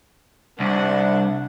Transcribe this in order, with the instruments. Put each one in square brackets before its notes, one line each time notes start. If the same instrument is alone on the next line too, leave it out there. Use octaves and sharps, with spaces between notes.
[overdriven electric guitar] C2 [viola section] D4 F#5